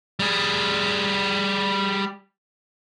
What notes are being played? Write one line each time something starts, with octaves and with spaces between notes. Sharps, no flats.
G3 G#4